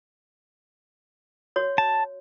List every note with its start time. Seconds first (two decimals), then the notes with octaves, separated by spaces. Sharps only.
1.56 F#4 C#5
1.78 A5